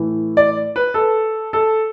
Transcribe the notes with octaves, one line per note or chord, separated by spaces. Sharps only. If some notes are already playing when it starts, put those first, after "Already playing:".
Already playing: A2 E3
D5
B4
A4
A4